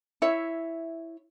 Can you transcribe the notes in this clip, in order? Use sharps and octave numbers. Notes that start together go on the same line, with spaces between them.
E4 C#5 E5